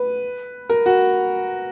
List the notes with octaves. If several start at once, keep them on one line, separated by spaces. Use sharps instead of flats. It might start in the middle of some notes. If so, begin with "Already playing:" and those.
Already playing: B4
A#4
F#4